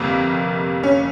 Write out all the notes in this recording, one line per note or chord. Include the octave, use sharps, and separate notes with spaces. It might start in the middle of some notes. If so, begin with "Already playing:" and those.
Already playing: G1 F2 C3 G3 A#3
C#4